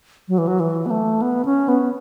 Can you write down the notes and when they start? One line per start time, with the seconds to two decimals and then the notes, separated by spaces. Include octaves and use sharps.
0.28 F#3
0.38 E3
0.47 F#3
0.60 E3
0.86 B3
0.90 A3
1.22 B3
1.45 C#4
1.68 B3